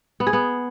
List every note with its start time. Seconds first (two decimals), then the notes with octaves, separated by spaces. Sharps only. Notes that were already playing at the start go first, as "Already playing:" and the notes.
0.20 B3
0.27 G#4
0.33 B3